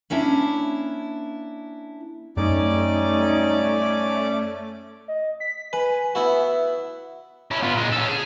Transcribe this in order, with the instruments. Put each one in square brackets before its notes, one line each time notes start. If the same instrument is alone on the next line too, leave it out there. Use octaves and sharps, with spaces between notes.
[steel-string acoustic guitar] A#3 C#4 D4 E4
[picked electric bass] F#2 [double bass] G3 D#4 [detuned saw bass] A3 [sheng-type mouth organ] C#4 D5 D6
[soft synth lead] D#5
B6
[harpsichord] B4 [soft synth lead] G#5
[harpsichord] B3 E4 F#4 [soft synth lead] E5
[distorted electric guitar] C#4 E4
B3 F4
A#2 G#3
C#4 A4
G#4